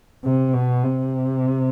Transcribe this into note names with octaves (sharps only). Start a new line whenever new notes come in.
C3
B2
C3